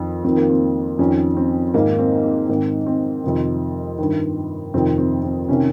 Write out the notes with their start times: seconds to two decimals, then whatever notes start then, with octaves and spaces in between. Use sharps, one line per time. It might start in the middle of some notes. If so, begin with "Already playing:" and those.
Already playing: F2 D#3
0.24 F2 D#3 C4
0.37 A#3
0.49 C4
0.99 F2 D#3 C#4
1.37 C4
1.74 G#2 D#3 A#3
1.99 C4
2.24 C4
2.49 G#2 D#3 C4
2.86 C4
3.24 F2 C3 D#3
3.98 G2 D#3
4.74 F2 C3 D#3 C4
4.98 C4
5.23 C4
5.49 C3 D#3 C#4